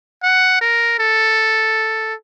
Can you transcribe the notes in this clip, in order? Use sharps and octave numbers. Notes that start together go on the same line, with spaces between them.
F#5
A#4
A4